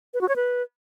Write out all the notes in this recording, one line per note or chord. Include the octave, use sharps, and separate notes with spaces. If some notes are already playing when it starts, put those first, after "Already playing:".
B4
F#4
C#5
B4